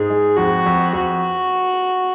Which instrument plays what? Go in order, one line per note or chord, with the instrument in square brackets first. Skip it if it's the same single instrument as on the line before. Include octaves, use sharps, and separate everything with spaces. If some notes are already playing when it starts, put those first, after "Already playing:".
Already playing: [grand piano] G#2 [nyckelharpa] G#4
[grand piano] G#3
[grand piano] F2 [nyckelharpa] F#4
[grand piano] F2
[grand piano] F2 [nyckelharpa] F#4